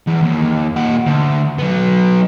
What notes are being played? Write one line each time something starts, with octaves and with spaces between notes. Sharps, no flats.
E2
D#2
A#2 F#5
D2
F#3 B3